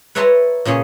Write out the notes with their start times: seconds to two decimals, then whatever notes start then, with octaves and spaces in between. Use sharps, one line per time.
0.15 B4 C#5 E5 A5 A#5 C6
0.65 A#2 C#3 G#4 C#5